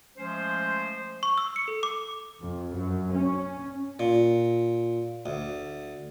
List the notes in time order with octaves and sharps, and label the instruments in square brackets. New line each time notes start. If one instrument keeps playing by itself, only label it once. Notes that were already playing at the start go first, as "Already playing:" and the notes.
[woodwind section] F3 G#3 A3 C#4 C5
[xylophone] C#6
E6
C#7
A4
D6
[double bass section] F2
F#2
C#4
[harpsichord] A#2
D2